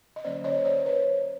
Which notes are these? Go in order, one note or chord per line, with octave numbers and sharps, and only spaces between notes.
D#5
D3 F#3 A#3 C#4 C5 D5
C#5 D#5
D#5
C5 D5
B4 C#5